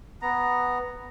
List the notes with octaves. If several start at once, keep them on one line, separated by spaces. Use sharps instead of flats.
B3 A#5